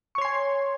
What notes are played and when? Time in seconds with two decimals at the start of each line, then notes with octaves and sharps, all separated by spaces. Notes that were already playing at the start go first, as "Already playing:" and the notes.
0.15 C#6
0.18 C#5
0.21 C6
0.25 G#5